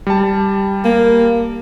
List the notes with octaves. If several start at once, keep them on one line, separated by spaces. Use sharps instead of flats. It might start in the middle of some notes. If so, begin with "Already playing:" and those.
G3 A5
A#3